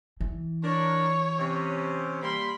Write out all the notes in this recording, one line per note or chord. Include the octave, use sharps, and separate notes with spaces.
E3
D4 A#4 C#5
C3 C#4
G3 A#3 B5 C6